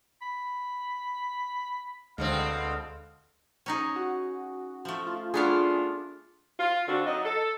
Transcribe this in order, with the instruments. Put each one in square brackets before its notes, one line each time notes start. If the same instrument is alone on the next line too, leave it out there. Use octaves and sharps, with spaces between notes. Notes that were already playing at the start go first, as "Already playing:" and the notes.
[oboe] B5
[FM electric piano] D2 G#3 [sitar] B2 D3 C4 [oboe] F5
[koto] C#4 D#4 G#4
[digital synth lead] F#4
[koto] F3 A3
[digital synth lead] F4
[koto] A3 B3 F5 [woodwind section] D4 F4 [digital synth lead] G#4
[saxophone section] F4
D3 C4 D4 F#4
F#3 D#4 F#4 D#5
A4